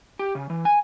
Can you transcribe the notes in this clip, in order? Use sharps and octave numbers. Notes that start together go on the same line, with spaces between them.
G4
C#3
E3
G#5